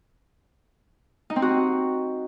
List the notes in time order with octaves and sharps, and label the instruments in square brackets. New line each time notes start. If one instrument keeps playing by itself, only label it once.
[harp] D#4
C4
F#4